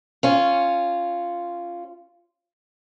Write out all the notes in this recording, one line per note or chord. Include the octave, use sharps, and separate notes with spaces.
C#4 F4